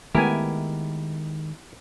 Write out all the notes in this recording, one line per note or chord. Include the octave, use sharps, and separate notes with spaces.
D#3 G#3 A3 B3 E4 G4 A#4 G#5